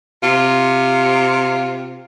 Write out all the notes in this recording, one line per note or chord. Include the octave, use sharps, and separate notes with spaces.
C3 F4